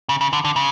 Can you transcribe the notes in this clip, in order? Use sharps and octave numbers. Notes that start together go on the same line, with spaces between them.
C#3
C#3
D3
D3
C#3